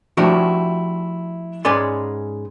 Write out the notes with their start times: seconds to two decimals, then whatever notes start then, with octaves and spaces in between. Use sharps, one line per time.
0.17 F3 A3 D4 E4 F#4 G4
1.65 G#2 G#3 C#4 B4 D5 C6